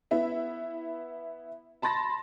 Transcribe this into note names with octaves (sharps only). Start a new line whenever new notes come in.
B3 E4 E5
A5 B5 C6 A6 A#6